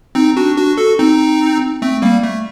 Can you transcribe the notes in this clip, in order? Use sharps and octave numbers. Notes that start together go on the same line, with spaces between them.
C4 D#4
D4 F#4
D4 F#4
F#4 A4
C4 D#4
A3 C4
G3 A#3
A3